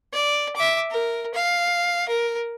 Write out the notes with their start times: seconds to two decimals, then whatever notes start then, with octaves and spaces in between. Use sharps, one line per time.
0.13 D5
0.56 E5 D6
0.91 A#4
1.35 F5
2.09 A#4